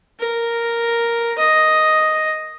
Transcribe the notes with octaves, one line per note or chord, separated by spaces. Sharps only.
A#4
D#5